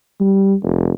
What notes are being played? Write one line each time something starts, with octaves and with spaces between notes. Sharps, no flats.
G3
F1